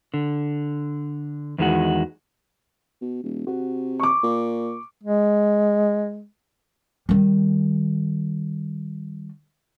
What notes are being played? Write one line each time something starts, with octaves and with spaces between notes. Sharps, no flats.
D3
E2 D#3 G#3 F#4
B2
D#1
C3 F#4
C#6 D6
A#2
G#3
D#3 G3